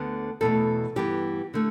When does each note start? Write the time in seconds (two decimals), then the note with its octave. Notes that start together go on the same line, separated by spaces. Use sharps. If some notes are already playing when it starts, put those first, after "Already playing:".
Already playing: D2 D3 B3
0.41 E2 B2 A3 A4
0.96 G2 E3 B3 G4
1.54 D3 A3